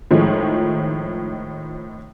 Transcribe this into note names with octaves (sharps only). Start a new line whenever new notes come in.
A2 D#3 F3 G#3